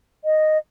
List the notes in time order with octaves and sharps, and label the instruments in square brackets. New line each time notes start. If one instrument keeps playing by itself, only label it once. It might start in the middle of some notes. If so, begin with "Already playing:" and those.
[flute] D#5